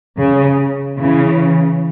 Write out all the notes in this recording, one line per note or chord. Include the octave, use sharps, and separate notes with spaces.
C#3
C#3 E3